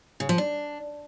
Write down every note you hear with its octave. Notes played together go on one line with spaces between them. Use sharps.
C#3
F3
D4